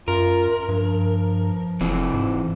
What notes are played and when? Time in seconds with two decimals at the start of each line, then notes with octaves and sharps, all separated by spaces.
0.08 F#2 F4 A#4
0.69 G2 F3
1.81 F1 E3 C4
2.14 G#2